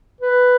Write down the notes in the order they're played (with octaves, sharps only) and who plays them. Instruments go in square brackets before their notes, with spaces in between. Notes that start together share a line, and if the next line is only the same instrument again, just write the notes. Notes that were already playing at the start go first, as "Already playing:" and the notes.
[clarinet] B4